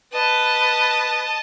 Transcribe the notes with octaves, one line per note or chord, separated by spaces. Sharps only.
B4 D#5 A5